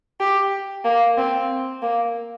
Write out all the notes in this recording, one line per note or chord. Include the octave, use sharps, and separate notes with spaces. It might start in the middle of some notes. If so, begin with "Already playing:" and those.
G4
A#3
C4
A#3